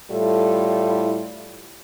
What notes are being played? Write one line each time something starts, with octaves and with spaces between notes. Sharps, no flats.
A2 G3 E4 F4 A4